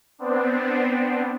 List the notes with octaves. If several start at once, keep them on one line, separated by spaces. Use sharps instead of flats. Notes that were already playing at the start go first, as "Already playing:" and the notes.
B3 C4 D4